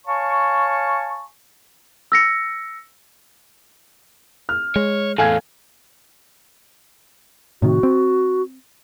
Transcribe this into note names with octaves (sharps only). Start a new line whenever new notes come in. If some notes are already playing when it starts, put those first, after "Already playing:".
C#5 F5 G#5 A5 C#6
E6 A#6 C#7
F6
G#3 C#5
E2 A2 A4 F5 G#5 G#6
A2 C3 D#3 F#4
C4